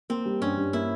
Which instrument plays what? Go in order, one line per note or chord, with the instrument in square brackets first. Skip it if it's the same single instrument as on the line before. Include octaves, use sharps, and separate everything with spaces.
[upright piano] A#3 [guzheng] C4
[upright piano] G3
[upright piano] G2 [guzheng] C#4
[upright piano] G2
[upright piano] A#3 [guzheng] E4